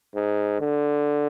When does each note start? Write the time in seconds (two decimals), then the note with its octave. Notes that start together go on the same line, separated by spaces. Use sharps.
0.15 G#2
0.60 D3